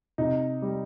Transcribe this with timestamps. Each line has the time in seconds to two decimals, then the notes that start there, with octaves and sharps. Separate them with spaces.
0.18 C3 D#4
0.62 G3